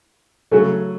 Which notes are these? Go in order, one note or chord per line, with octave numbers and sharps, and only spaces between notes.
C#3 F#3 A3 C#4